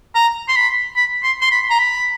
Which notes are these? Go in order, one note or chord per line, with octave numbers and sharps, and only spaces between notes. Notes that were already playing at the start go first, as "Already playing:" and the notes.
A#5
C6
B5
B5
C6
C6
B5
A#5
B5